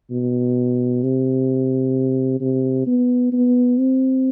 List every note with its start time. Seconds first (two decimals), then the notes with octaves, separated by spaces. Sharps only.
0.11 B2
1.03 C3
2.41 C3
2.87 B3
3.33 B3
3.79 C4